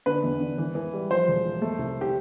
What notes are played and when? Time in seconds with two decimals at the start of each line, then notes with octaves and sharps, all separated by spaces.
0.06 D3 B4
0.23 E2
0.41 D3
0.58 E3
0.75 E3
0.93 G3
1.10 F3 C5
1.28 E1
1.44 F3
1.62 A3
1.79 C2
2.01 G4